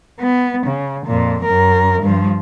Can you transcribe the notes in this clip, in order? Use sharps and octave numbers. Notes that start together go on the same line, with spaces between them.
B3
C#3
F2 A#2
F#2 A#4
G2 F3